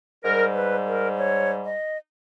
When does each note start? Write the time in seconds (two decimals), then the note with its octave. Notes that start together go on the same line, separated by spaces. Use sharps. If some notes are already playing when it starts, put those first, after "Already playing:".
0.24 G#2 G3 A#4
0.55 B4
0.87 A#4
1.19 C#5
1.65 D#5